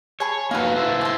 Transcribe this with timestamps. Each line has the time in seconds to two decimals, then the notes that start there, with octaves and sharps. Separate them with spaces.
0.20 G#4 C#5 A5 B5
0.51 A#3 D#4 F#4 B4 F5
0.76 E4 A4 C5
1.01 A5 C6